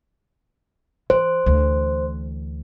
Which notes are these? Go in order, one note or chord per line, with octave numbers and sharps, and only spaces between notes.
E3 C5
D2 E3